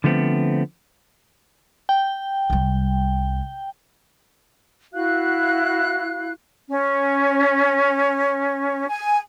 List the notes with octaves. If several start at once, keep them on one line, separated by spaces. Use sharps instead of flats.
D3 F3 A3 B3 C4
G5
C2 G3
E4 F#4 F5 F#6
C#4
G#5